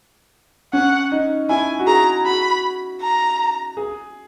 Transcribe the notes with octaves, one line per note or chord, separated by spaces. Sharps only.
C#4 F#5
D#4
E4 G#5
F#4
G#4 A#5
F#4 B5
A#5
G#4